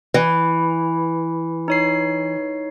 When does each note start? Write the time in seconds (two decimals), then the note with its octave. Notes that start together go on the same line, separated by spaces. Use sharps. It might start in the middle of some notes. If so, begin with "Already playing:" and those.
0.14 E3
1.68 D#4 C#5 C7